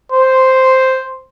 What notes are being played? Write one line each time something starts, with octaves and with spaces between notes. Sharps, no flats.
C5